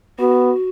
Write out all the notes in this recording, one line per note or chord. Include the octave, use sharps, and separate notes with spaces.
B3 F#4